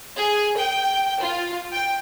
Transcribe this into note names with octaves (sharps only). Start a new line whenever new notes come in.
G#4
G5
F4
G5